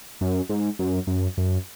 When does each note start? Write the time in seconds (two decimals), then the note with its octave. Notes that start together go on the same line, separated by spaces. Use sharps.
0.21 F#2
0.49 G#2
0.79 F#2
1.07 F#2
1.37 F#2